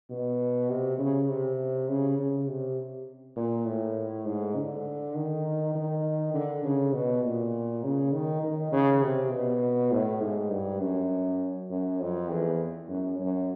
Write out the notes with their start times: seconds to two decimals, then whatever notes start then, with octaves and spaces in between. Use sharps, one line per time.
0.10 B2
0.70 C3
0.99 C#3
1.29 C3
1.89 C#3
2.18 C#3
2.47 C3
3.36 A#2
3.66 A2
4.26 G#2
4.56 D3
5.15 D#3
5.75 D#3
6.34 D3
6.64 C#3
6.94 B2
7.24 A#2
7.83 C#3
8.13 D#3
8.43 D#3
8.72 C#3
9.02 C3
9.32 B2
9.92 A2
10.22 G#2
10.51 G2
10.81 F#2
11.70 F#2
12.00 F2
12.30 E2
12.89 F#2
13.19 F#2